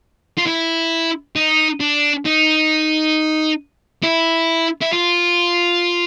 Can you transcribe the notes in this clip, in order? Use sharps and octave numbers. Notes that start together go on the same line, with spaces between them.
F4
E4
D#4
D4
D#4
E4
E4
F4